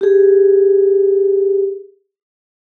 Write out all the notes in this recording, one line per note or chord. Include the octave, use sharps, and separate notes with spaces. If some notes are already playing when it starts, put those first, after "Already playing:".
G4 G#4